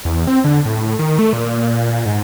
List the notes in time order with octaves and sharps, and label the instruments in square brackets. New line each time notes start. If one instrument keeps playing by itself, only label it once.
[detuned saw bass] E2
C4
D3
A2
D#3
A3
A#2
G#2